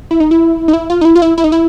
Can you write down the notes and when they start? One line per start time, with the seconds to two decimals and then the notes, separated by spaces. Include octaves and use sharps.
0.11 E4
0.20 D#4
0.31 E4
0.68 D#4
0.73 E4
0.90 F4
1.01 D#4
1.05 E4
1.16 F4
1.22 E4
1.38 E4
1.44 D#4
1.52 E4